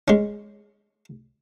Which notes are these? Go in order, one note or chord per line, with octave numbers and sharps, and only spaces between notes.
G#3 C#4